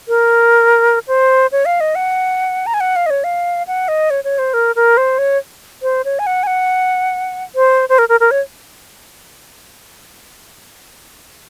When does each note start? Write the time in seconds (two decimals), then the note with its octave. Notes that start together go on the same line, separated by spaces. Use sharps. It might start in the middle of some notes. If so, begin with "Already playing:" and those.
0.08 A#4
1.08 C5
1.52 C#5
1.65 F5
1.80 D#5
1.95 F#5
2.67 A#5
2.74 G#5
2.80 F#5
2.96 F5
3.06 D#5
3.10 C#5
3.24 F5
3.67 F#5
3.88 D#5
4.10 C#5
4.24 C#5
4.39 C5
4.54 A#4
4.76 A#4
4.97 C5
5.18 C#5
5.83 C5
6.05 C#5
6.19 G#5
6.27 F#5
6.43 G#5
6.47 F#5
7.55 C5
7.89 C5
7.99 A#4
8.09 A#4
8.20 A#4
8.31 C#5